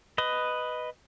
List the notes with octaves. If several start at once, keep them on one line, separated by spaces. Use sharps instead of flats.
B4 D#5